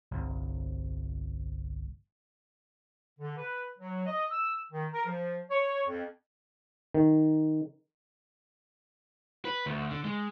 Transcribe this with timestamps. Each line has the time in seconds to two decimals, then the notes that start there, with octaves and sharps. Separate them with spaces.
0.11 G1 C2
3.20 D3
3.37 B4
3.79 F#3
4.07 D#5
4.31 E6
4.72 D#3
4.93 A#4
5.06 F3
5.50 C#5
5.86 F2
6.94 D#3
9.45 B4
9.66 D2
9.91 D3
10.05 G#3